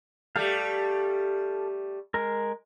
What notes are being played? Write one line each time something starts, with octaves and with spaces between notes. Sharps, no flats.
G3 A3 G4 A4 F5
G#3 A#4